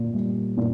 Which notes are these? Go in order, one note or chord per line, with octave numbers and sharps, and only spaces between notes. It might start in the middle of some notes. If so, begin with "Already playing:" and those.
Already playing: A#2
G3
A#2